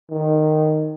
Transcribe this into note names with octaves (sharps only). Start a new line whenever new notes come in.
D#3